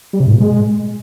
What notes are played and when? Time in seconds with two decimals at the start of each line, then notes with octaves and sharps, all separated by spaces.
0.13 G3
0.20 C3
0.27 G#2
0.34 A#2
0.40 G#3